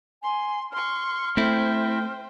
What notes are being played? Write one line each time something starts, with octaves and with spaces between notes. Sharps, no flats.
G#5 C6
C6 C#6 F6
A3 C4 E4 C5 G5